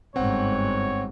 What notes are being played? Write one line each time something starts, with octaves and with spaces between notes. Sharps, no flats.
G1 G#2 C4 C#5 F#5